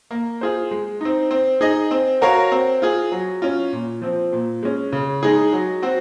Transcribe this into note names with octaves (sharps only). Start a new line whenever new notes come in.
A#3
F4 G#4 C5
G#3
C4 D#4
C4
D#4 G#4 D#5
C4
F#4 A#4 C#5 F5
C4
F4 G#4
F#3
C#4 F4
A#2
F3 C4
A#2
G#3 C#4
C#3
G#3 D#4 G#4
F#3
C4 F#4